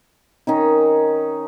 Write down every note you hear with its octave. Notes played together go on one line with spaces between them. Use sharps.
D#3 C#4 D#4